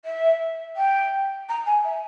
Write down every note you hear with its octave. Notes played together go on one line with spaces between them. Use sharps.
E5
G5
A#5
G#5
E5